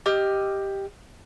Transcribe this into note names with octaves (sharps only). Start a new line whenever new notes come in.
G4 D#5 E6 F6